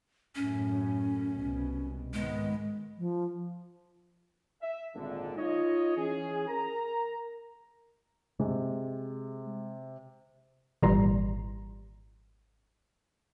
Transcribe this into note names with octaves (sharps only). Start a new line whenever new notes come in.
F#2 A2 C#4
C2 B2
G#2 D#3 G#3 B3
F3
E5
G#1 A#2 D3
D#4 F4 C#5 D#5
E3 C#4 G#4
A#4 A#5
C3 G#3
G#1 A#2 E3 G3 A#5 C6